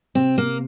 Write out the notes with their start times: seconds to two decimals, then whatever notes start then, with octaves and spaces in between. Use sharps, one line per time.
0.15 C3 C4
0.38 A#3